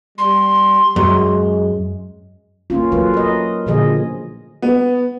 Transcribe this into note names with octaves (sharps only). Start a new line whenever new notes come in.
G3 C6
F#2 G#3
A#3 C#4 F4
F#3 A3 F4 B4
A#4 D#5
A#2 D3 F3 G#4 D#5
B3